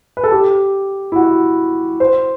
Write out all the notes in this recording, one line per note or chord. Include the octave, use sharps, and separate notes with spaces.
B4
A4
G4
E4
F#4
C5